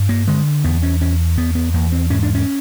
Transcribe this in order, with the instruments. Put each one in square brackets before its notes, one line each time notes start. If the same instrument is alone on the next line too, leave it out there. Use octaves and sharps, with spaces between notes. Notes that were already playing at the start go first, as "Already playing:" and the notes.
Already playing: [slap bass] G2
A#3
D3 G#3
E2 B3
C#4
E2 C#4
E2 B3
B3
E2 A#3
C4
G#2 C#4
D4
C#4